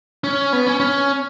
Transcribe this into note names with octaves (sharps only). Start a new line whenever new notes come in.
C#4
B3
C#4
C#4